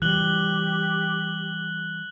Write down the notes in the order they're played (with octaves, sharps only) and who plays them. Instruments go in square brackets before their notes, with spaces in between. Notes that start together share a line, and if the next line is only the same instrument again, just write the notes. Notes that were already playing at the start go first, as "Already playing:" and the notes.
[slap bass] E3 G3 [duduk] G4 [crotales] F#6 F#7 G7